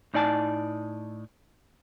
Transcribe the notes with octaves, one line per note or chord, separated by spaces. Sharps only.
A2 D#4 D5 G#5 A5